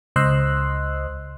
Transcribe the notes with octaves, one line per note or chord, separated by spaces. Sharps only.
C#2 C5 D#5 C6 E6 F#6